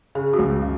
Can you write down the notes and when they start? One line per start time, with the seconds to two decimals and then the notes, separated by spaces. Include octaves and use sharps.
0.15 C#3 G#4
0.33 F#4
0.39 C#2
0.63 C#3